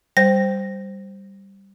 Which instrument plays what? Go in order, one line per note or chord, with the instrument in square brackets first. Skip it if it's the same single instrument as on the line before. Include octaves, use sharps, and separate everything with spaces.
[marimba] G3 [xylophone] C5 A#6